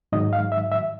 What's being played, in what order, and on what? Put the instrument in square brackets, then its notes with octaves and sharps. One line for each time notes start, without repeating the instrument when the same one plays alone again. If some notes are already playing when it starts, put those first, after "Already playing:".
[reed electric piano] G#2 D#3 F#3 D#5
F5
E5
E5